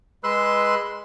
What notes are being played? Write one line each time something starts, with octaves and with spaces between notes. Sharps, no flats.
G#3 B4 C6 E6 F#6